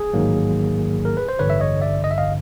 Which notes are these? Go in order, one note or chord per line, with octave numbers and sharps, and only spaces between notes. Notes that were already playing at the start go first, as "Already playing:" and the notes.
Already playing: G#4
A1 G#2 D#3 F#3 A#3
A#4
B4
C5
A1 G2 D3 B4 C#5
E5
C#5 D#5
D5 E5
D#5
E5
D#5 F5